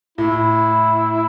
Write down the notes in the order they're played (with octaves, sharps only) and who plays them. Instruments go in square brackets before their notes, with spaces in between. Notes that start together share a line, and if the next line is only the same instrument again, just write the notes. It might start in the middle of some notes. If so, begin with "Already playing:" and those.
[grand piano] A2 [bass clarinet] E4